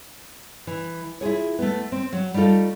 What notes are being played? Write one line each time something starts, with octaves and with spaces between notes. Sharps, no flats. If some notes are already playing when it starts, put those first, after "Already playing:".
E3
E4 F4 G#4 C#5
A3 B3
C4
F#3
G3 A3 D#4 F4 A4